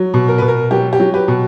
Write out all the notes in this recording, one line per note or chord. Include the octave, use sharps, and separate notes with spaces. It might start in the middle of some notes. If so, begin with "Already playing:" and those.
Already playing: F#3
B2
A#4
B2 B4
A#4
F#3 G4
G4
F#3
G4 B4
B2